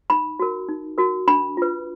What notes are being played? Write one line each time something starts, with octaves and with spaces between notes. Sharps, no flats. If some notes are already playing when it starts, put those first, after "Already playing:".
D#4 B5
F#4 A#4
D#4
F#4 A#4
D4 B5
F4 B4